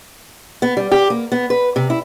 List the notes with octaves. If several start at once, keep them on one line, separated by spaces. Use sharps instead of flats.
B3
G3
G4
A#3
B3
B4
C3
E4